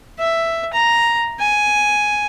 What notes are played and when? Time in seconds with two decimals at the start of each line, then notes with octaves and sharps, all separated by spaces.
0.19 E5
0.73 A#5
1.40 G#5